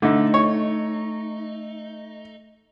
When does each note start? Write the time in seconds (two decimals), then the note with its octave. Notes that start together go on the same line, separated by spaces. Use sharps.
0.02 D3 A3 D#4
0.34 C#5